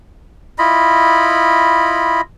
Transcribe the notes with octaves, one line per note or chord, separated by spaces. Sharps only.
E4 F4 D#5 B5